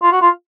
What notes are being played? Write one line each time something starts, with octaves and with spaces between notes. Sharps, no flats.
F4
F#4
F4